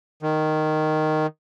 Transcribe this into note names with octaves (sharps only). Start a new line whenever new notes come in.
D#3